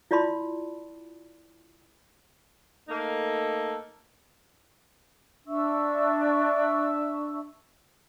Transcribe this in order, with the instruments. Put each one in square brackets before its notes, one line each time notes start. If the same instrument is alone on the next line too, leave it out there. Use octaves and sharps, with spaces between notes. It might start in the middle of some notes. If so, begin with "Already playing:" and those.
[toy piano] E4 F4 D5 A5 B5 C6
[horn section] A3 A#3 D#4 A4
[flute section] D4 E5 C#6 E6